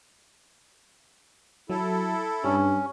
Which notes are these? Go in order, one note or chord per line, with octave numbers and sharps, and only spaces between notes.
F#3 E4 A4
G2 G3 C#4